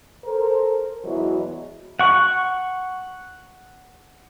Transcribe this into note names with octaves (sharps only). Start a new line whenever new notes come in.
A4 A#4 C5
E2 B2 E3 F#3 G#3 E4
F#5 C#6